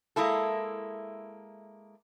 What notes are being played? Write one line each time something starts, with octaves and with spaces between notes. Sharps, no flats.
G#3 A#3 E4 A4